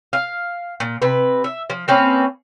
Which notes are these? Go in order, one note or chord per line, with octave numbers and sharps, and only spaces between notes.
F5
A#2
C3 B4
E5
F3
A#3 C4 C#4 B4